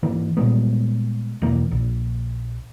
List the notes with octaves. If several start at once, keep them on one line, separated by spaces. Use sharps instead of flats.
G#2 E3 A#3
A#2 G3 G#3 B3
E1 E3 A#3
A#1